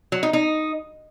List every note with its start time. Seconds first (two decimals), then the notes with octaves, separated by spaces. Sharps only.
0.12 F#3
0.23 D#4
0.33 D#4